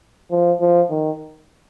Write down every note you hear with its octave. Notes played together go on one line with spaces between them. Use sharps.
F3
F3
D#3